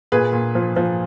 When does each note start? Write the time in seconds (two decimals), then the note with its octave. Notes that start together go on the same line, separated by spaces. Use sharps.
0.12 A#2 G#4 B4
0.33 A#2
0.55 F3
0.76 F3